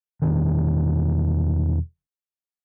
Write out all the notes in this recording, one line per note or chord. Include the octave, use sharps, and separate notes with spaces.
E1 C2 D#3